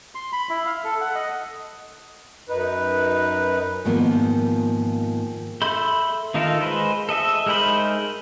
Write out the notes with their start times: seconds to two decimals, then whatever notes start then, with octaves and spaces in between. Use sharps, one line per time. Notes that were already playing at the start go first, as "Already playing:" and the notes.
0.15 C6
0.32 B5
0.50 E4
0.66 F5
0.84 A4
1.01 F#5
1.15 D#5
2.49 F#2 D#4 B4
3.85 G#2 D#3 F3 A#3 B3
5.62 A4 E5 B5 C6 G6
6.34 D#3 D#4 F4 A4 A#4
6.61 G#3 B4 C5
7.09 A4 D#5 E5
7.46 G#3 D#4 A#4 C5 B5